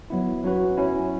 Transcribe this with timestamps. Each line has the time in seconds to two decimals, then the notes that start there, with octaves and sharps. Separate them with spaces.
0.10 F#3 B3 E4
0.44 F#3 C#4 F#4 B4
0.77 F#3 C#4 E4